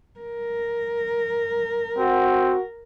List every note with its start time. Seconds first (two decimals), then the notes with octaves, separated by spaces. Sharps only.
0.20 A#4
1.98 C4 F#4